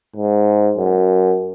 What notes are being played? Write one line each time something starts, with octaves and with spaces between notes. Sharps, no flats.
G#2
F#2